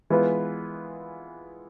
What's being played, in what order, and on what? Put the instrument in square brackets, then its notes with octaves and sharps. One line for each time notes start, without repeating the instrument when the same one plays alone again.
[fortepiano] E3 G#3 B3 F4 B4